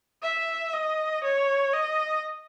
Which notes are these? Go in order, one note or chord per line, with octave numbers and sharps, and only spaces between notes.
E5
D#5
C#5
D#5